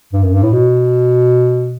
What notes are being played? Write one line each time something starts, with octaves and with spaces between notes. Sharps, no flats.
G2
F#2
G2
A2
B2